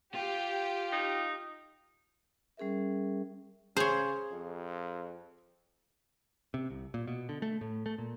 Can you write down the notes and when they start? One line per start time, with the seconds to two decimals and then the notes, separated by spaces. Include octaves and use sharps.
0.15 F4 G4
0.92 D#4
2.57 G3 C#4 G#4 A#4 E5
3.77 C#3 G#4 C5 C#5
4.31 F2
6.54 C3
6.70 C2
6.94 A#2
7.07 B2
7.29 D3
7.42 A3
7.61 A2
7.86 A3
7.98 A#2